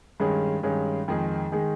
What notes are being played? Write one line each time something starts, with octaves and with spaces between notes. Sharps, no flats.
G2 D#3 G#3 C#4 G#4
G2 D#3 G#3 C#4 G#4
F2 D#3 G#3 D#4 G#4
D#3 G#3 D#4 G#4